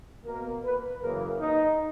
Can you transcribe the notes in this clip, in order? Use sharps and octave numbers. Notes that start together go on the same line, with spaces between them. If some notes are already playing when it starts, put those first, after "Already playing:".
B2 A#3 A#4
B4
F#2 C#3 E3 A#3 A#4
D#4